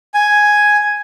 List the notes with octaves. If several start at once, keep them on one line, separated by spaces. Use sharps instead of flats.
G#5